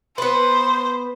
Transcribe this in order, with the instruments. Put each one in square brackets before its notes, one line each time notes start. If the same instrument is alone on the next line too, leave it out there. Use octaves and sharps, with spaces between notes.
[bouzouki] B3 B4 [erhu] C5